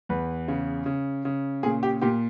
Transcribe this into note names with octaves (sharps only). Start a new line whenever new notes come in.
E2 B4
C#3
C#3
C#3
A#2 G#4
G4
A#2 G4